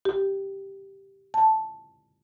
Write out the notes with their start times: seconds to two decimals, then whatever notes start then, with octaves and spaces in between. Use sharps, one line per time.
0.05 G4
1.34 A5